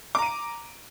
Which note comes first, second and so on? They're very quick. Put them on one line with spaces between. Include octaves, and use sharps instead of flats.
D6 A#5 D#7 D7